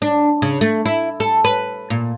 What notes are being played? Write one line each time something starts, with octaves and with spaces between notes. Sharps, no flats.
D4
C#3
A3
E4
A4
B4
A#2